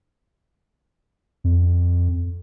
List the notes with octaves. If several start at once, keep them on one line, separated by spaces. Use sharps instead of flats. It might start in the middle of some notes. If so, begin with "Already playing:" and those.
F2